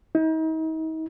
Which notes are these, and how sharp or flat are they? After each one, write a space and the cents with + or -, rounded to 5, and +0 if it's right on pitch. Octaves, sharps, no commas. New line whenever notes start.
D#4 +40